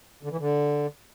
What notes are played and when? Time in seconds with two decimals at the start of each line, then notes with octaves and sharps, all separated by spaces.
0.23 D3
0.31 E3
0.39 D3